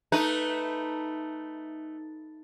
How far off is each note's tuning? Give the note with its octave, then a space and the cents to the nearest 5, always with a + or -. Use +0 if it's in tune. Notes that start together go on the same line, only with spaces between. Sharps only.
A3 +0 D#4 +0 B4 +0